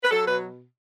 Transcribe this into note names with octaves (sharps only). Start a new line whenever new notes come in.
B4
F#3 A4
B2 B4